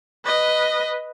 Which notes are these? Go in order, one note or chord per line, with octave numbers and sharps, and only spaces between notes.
B4 D#5